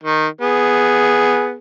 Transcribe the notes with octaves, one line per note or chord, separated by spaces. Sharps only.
D#3
B3 G#4